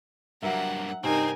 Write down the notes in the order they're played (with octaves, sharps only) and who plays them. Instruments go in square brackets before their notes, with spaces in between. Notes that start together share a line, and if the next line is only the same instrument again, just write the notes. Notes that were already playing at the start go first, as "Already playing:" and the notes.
[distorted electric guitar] G2 A#3 [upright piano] F#3 A#4 E5 [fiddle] F#5
[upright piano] G2 C3 [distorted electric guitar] C4 [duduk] D#4 [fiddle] A#4 G#5